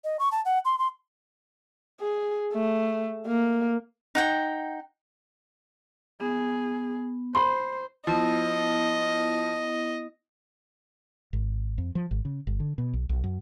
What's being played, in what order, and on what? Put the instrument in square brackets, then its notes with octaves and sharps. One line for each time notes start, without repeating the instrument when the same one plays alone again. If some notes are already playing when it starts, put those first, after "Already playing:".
[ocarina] D#5
C#6
A5
F#5
C6
C6
[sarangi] G#4
A3
A#3
[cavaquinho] D#4 F#5 G5
[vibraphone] B3 [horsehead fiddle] G#4
[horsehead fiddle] C5 [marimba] B5 [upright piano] C6
[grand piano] F3 [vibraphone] B3 E4 [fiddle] D#5
[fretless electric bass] G#1
F2
F3
G#1
C#3
G1
D3
B2
B1
B1
F#2